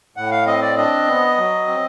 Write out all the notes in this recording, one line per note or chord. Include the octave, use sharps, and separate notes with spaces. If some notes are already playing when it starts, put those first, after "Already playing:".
A2 F#5
F5
C4 D#5
D5
D4 D#5
B3
F#3
C4